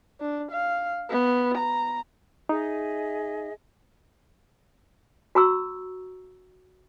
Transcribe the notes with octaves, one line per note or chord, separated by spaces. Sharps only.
D4
F5
B3
A#5
D#4 G#4 D#5 E5
F#4 A#5 C#6 E6